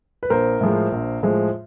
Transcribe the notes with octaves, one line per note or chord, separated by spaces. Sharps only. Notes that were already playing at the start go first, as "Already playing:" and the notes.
B4
A#1 A#4 C5
A2 F3 G#3
A#1
A2 F3 G#3